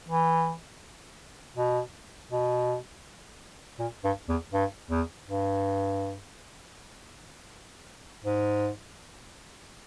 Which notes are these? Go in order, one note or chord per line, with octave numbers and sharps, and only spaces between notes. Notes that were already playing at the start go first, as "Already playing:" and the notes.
E3
B2
B2
A#2
G2
E2
G2
E2
G2
G#2